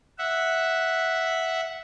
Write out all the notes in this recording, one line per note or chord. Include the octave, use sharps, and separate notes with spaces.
E5 F#5